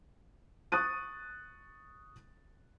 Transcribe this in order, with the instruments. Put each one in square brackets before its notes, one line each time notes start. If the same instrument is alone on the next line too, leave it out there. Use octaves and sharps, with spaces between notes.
[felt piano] C#6 D#6 F#6 A6 D#7